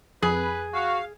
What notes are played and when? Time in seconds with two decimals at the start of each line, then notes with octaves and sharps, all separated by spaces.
0.22 F2 G#4 B4
0.74 F#4 F5